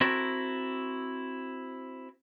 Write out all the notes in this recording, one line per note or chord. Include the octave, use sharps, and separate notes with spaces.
C4 E4 F#4 A4 A#4